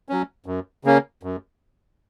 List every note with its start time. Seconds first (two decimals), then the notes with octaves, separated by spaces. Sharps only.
0.09 F#3 C#4
0.46 F#2
0.84 C#3 A#3 C#4
1.23 F#2